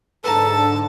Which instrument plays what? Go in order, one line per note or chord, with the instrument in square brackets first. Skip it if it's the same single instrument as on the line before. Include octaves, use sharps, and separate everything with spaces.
[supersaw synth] G#2 D3 [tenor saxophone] A4 [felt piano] B4 A#5 [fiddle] A5